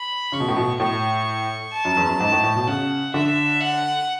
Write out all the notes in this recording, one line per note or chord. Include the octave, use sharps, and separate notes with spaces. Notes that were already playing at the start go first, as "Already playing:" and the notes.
Already playing: B5
C#3 C#6
B2
A2
B2
A2 C#6
A5
F#2
E2
F#2
G#2
A2
A2
B2
C#3 F#5
D3 E5
F#5